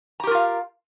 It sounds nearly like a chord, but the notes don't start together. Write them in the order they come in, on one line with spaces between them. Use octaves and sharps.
A#5 G4 A#4 F4 F5